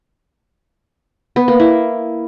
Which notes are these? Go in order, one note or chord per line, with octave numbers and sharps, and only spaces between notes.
B3
A#3
E4